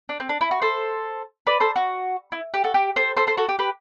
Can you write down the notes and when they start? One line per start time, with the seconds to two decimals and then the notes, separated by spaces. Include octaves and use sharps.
0.09 D4
0.20 C4
0.29 D4
0.41 E4
0.51 F#4
0.61 A4 C5
1.47 B4 D5
1.60 A4 C5
1.76 F#4
2.32 E4
2.54 G4
2.64 F#4 A4
2.74 G4
2.96 A4 C5
3.17 A4 C5
3.27 A4 C5
3.37 F#4 A4
3.49 G4
3.59 G4 B4